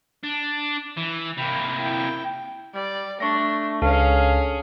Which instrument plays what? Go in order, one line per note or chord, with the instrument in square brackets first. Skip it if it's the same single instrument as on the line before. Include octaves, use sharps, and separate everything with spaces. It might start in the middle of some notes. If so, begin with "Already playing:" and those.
[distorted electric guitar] D4
E3
[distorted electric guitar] C3 A#3 [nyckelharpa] G5 B5
[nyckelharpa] E4 G5
[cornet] G3 [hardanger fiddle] D5
[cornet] A3 [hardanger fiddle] D4 [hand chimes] C#6 A#6
[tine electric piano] C#2 [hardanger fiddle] C#4 G#4 [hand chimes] A4 A5 [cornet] F5